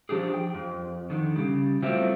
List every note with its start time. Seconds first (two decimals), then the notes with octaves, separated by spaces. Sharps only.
0.09 F3 D4 G4 G#4
0.34 G5
0.54 F2
1.10 D3 D#3
1.36 C#3 G3
1.82 F#3 G3 A3 C4 E4 F4